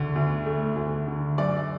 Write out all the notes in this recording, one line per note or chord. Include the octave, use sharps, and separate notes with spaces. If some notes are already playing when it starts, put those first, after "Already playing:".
Already playing: D2 D3
D2
A3
D2
D3
F#2 D5